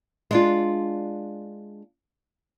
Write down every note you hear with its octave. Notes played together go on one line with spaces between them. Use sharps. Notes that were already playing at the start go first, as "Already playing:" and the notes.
G#3 D4 F4